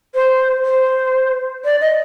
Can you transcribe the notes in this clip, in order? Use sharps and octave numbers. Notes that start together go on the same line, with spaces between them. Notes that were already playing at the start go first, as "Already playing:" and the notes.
C5
C5
D5
D#5